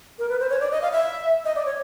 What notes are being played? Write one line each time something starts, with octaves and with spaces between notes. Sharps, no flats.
A#4
B4
C5
C#5
D5
D#5
F5
E5
D#5
D5
C#5